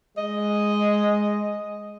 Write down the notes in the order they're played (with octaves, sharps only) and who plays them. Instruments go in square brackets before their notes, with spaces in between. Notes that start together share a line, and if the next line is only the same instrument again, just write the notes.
[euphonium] G#3 [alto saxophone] D#5